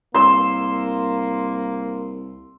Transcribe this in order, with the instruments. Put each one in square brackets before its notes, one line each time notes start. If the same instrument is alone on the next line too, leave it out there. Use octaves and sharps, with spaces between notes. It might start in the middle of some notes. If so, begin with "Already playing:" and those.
[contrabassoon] C2 [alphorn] A#3 [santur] C6 E6